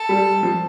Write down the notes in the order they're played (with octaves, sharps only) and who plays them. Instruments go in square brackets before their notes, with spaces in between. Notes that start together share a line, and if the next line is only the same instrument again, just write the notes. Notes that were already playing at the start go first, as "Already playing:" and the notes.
Already playing: [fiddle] A4
[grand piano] G3
F3